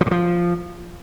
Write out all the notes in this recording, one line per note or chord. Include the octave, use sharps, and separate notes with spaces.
F3
G2
F3